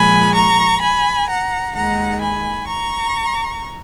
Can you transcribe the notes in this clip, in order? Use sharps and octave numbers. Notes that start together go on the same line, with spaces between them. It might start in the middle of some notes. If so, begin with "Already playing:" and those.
Already playing: A#2 F3 G#3 G#5 B5
A#5 C#6
G#5 B5
F#5 A#5
D#2 D#3 G#3 F#5 A#5
G#5 B5
A#5 C#6